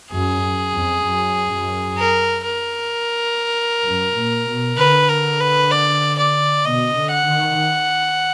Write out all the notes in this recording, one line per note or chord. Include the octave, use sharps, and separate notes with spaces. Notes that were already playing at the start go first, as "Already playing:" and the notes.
F#2 G#4
F2
F#2
F#2
A#4
A#4
F#2
A#2
B2
D3 B4
A#4
B4
D5
D5
B2 D#5
D3
F#5
D#3